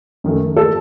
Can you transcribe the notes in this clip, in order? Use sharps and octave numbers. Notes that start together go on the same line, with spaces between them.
F#2 D#3 A3
A4